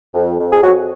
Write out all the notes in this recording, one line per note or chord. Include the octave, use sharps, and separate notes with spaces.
F2
F2
G#4
F2 F#3 F#4